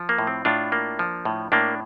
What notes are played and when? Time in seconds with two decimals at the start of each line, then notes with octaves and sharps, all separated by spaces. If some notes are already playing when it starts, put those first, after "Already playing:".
Already playing: F3
0.09 A#3
0.18 A2
0.27 C4
0.45 A2 D4 F4
0.72 A#3
0.99 F3
1.25 A2
1.52 A2 A#3 D4